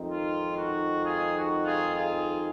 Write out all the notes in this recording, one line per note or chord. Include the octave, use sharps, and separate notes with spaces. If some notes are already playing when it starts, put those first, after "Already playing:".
Already playing: F2 D#3 G#3 C4 D#4
F4
F#4
F4 G#4
F#4
F4 G#4
F4 G#4